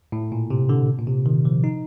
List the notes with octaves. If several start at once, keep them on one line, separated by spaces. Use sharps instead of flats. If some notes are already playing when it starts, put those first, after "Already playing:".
A2
A#2
C3
D3
A#2
C3
D#3
F3
D#4